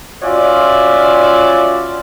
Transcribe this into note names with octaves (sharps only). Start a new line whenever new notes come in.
C#4 F4 F#4 C#5 D5 E5